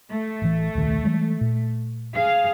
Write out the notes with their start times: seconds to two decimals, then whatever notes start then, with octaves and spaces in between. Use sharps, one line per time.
0.11 A3
0.42 A1 E3
0.75 D#1 C2 D#3
1.04 E3 G3 G#3
1.41 A#2
2.15 G#4 F5